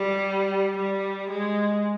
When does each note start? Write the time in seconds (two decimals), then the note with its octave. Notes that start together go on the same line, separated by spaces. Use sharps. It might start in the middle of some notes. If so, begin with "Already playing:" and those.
Already playing: G3
0.78 G3
1.30 G#3